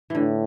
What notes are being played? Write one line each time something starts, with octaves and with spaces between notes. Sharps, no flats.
A2 D3 E3